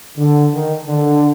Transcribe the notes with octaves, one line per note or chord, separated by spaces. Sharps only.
D3
D#3
D3